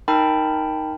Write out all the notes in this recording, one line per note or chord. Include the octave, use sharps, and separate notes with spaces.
D#4 A#4 G5 A5 B5